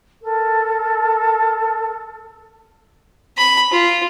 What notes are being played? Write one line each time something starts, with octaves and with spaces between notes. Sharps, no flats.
A4 A#4
B5
F4